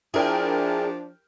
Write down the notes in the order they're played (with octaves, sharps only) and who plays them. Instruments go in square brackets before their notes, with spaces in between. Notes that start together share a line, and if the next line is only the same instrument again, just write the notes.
[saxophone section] F3 D4 [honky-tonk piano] E4 A#4 G5 [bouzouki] G#4